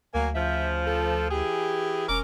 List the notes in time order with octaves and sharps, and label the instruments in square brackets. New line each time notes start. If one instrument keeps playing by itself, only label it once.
[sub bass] D2 [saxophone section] F#3 A#3 [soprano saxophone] G#5
[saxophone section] C#3 F3 [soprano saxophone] E5
[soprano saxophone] A4
[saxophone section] E3 G#4 [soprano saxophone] G4
[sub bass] E1 [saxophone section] C#4 A#4 [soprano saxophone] D6